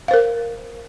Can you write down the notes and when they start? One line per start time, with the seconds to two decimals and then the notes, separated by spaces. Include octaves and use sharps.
0.08 F5
0.11 C5
0.14 A#4